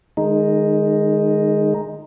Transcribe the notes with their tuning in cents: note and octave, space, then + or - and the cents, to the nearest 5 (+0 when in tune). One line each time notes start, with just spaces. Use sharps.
D#3 -30 G#3 +0 D#4 +0